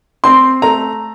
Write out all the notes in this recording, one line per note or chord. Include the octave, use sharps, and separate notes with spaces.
C4 C6
A3 A#5